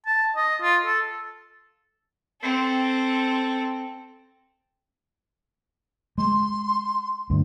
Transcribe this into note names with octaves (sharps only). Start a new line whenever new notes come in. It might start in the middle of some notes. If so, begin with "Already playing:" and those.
A5
D#5
F4
A4
C4 A4
G#3 C6
D2 G2